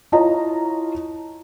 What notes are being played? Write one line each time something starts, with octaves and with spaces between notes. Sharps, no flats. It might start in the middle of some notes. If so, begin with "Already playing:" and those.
E4 F4 C#5 D#5 A5 A#5